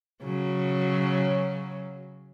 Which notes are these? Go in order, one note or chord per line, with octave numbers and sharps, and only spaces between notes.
C#3 F#3